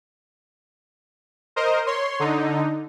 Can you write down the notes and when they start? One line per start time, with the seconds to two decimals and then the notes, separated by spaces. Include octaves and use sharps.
1.56 A#4 C5 D#5
1.86 C#5 C6
2.19 D3 D#4